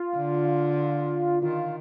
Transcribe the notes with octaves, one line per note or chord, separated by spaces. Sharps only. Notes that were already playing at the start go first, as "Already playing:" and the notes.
Already playing: F4
D3
D#3 F4